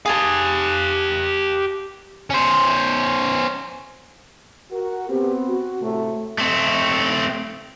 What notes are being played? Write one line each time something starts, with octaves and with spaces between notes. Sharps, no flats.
G4 G#4 F5 G#5 A5
C#4 C5
F#4 A#4
B3 C4 G4
F#4
A2 C3 A3
A3 C4